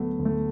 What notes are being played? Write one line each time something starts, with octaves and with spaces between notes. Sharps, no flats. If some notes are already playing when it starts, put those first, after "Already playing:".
Already playing: D2 F#3 A3 B3
D2
A3